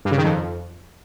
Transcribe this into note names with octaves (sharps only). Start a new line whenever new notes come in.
G2
C#3
D#3
F2